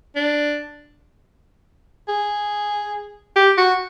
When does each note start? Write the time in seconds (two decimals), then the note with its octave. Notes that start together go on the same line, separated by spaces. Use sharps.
0.16 D4
2.08 G#4
3.36 G4
3.58 F#4